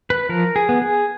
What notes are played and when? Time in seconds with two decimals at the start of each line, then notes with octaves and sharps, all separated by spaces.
0.10 B4
0.29 F3 A#4
0.56 G#4
0.69 B3
0.82 G#4